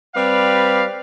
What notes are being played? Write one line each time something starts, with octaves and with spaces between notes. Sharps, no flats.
G3 C4 G4 B4 D5 F5